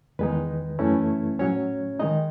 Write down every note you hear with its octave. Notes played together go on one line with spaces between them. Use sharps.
E2 D#3 G#3 D#4 B4
F#2 E3 A3 C#4 E4
A2 F#3 C#4 C#5
D#3 G#3 D#4 D#5